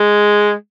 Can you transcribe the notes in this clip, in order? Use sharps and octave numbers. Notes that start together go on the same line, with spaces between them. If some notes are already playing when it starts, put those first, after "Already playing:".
Already playing: G#3